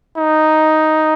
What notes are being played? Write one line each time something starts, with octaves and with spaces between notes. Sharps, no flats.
D#4